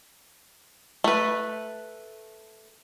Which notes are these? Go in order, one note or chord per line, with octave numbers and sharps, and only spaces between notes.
A3 B4